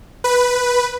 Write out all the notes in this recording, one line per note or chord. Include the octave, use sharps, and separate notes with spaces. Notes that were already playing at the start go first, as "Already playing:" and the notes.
B4